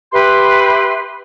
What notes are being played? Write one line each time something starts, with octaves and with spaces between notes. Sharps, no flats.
G4 B4 E5 C6